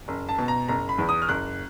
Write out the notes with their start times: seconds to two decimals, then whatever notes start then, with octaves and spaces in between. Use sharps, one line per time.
0.08 F#1
0.29 A5
0.39 B2
0.48 A#5
0.68 F#1 A#5
0.89 B5
0.98 E2
1.09 D#6
1.22 F6
1.29 F#1 F#6